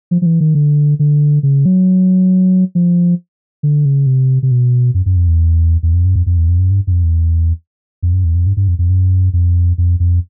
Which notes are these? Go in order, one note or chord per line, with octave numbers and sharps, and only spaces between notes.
F3
F3
E3
D#3
D3
D3
C#3
F#3
F3
D3
C#3
C3
C3
B2
F#2
F#2
F2
E2
E2
F2
F#2
F2
F2
E2
F2
F#2
G2
F#2
F2
E2
F2
F#2
E2
F2
G2
G2
F2
F2
F#2
F2
F2
F2